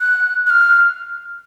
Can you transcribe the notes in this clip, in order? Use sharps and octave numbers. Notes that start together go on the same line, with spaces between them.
F#6
F#6
F6